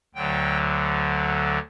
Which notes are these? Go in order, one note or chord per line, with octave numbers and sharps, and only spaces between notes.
D2 D3 F#3 G5